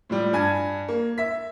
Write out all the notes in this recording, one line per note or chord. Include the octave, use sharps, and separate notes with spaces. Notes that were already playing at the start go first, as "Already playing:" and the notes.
A2 F3 G3
G2 G#5 A5 G#6
A#3
E5 B6